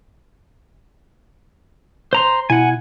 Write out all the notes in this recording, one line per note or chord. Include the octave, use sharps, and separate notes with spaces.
C5 A#5 C6
B2 E4 F#5 G#5